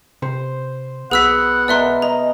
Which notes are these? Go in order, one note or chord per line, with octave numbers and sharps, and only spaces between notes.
C3 C5
B1 B3 F#4 G#4 F#5 E6 B6
B2 A#4 D5 E5 C6
D#5 A#5